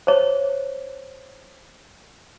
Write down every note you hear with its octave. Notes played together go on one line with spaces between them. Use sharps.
C5 C#5